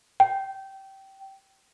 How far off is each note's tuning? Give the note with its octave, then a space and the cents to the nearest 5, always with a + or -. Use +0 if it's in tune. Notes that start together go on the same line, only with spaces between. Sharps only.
G5 -20